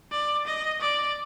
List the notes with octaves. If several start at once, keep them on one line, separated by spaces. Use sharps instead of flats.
D5
D#5
D5